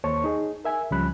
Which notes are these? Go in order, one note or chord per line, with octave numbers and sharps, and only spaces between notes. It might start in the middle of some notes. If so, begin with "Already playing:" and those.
D#2 A#3 C5 C#5 A5 C#6
D#4 G#4
A#4 E5 G#5
C#2 F3 G3 C#4 B5 F#6